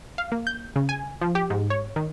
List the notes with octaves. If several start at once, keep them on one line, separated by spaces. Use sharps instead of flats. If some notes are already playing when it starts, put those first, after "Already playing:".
F5
A#3
G6
C#3
G#5
F3
G4
G#2
C#5
D#3